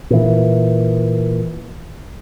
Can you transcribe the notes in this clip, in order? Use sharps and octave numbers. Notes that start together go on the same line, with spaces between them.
A#2 E3